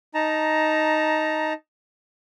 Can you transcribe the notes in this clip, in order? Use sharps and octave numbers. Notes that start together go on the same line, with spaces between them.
D#4 A5 A#5